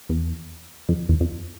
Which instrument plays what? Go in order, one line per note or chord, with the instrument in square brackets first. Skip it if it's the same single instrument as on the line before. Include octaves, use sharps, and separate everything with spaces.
[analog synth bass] E2
F2
E2
F2